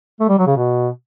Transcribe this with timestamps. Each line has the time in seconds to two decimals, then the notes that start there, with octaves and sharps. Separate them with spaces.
0.20 A3
0.28 G3
0.38 F#3
0.47 C#3
0.56 B2